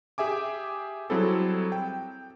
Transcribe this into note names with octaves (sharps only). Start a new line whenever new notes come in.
G4 G#4 E5 G#5 D6
F#3 G3 C4 E4 G#4 A4
G5